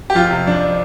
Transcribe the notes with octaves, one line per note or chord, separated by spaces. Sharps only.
G4
F2 F4
C3
F2 D4